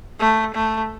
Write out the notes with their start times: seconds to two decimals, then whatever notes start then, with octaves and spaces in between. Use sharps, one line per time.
0.19 A3
0.55 A3